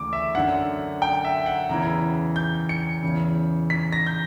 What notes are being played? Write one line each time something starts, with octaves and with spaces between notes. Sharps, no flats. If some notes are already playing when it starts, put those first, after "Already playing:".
Already playing: D2 C#3 E3 D6
E5
F#2 D3 F#5
G5
E5
F#5
E2 C#3 E3 A#5
G6
C#7
E2 C#3 E3
B6
A#6
G6